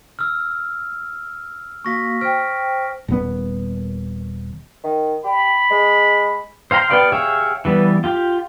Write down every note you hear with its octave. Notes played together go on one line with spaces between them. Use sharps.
E6 F6
A#3 F#4 F5 C#6 A#6 B6
C5 G5 F6 B6 D7
D#1 B3
D#3
G4 B5
G#3
C5 F5 G5 A#5 C6
B3 G4 B4 D5 F5
G4 G#4 C#5 E5 F5
E3 G3 B3
F4 G4